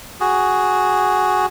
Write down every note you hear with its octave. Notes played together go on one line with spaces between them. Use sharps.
F#4 G#4